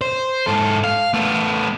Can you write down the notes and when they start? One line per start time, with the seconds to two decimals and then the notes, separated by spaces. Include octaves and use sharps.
0.01 C5
0.47 G#2 A4
0.84 F5
1.14 A3 B3